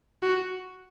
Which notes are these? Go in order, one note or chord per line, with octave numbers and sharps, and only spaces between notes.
F#4